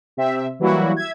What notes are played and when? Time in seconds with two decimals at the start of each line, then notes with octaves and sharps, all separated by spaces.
0.17 C3 C4 E5
0.59 E3 F#3 G3 A#3 E4 F#4
0.96 E5 G#6